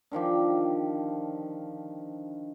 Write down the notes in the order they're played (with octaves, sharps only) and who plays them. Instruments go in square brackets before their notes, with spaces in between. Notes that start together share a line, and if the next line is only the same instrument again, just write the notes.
[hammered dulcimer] D3 D#3 F3 G4